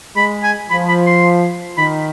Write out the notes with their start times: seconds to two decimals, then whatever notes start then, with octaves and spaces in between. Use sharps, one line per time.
0.16 G#3 B5
0.44 G#5
0.71 F3 B5
0.89 B5
1.06 C6
1.78 D#3 B5